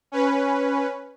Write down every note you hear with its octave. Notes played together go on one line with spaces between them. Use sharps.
C#4 B4